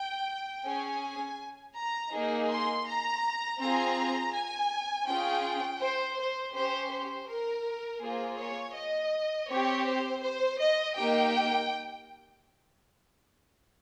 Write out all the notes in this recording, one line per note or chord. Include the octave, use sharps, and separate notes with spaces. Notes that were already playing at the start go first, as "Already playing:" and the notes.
Already playing: G5
C#4 G#4 G#5
A#5
A#3 D#4 G#4
C6
A#5
C4 F4 G#4 A#5
G#5
C#4 F4 G#4 G5
C5
C5
C#4 G4 C5
C5
A#4
A#3 F4 G#4 C5
C#5
D#5
C4 G4 C#5
C5
C5
D#5
A#3 D#4 G4 G5